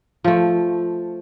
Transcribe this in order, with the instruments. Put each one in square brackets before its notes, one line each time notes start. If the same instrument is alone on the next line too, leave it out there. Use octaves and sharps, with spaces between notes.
[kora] F3 A3